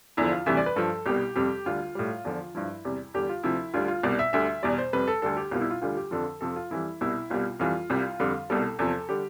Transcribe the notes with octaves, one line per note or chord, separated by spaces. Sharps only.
E2 D3 F3 E4
F4
D2 C3 E3 G3 E5
D5
B4
G2 F3 A4
C2 B2 G3 G4
F2 C3 G3 G4
D2 D3 G3 F4
A2 G3
E2 D3 F3 F4
G2 F3 E4
E2 C3 G3
E2 D3 G3 G4
F4
D2 C3 F3 E4
D2 D3 G3 F4
F4
C2 B2 G3 D5
E5
D2 D3 G3 E5
E2 B2 G3 D5
C5
F2 C3 G3 B4
A4
D2 D3 G3 A4
G4
C2 B2 G3 F4
E4
F4
D2 D3 G3 F4
G4
F2 D3 F3 A4
F2 C3 F3 A4
F4
F2 E3 G3 E4
C2 B2 G3 E4
C2 B2 G3 F4
F2 E3 G3 F4
C2 C3 G3
F2 D3 G3
C2 B2 G3 A4
E2 C3 F3 A4
D3 G3 G4